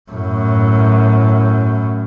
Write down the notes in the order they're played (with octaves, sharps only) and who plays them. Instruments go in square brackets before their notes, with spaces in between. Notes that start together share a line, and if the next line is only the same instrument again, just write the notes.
[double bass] F#2 A2